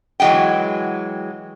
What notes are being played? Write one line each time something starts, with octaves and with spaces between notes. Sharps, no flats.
E3 F#3 G#3 F#5 G5